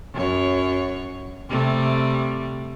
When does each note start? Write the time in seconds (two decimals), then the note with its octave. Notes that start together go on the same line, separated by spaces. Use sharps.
0.14 F#2 C#5
1.49 C3 G3 A3